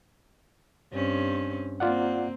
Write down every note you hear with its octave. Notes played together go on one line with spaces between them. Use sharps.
G2 C4 C#4
A#3 C4 F4 D5 F#5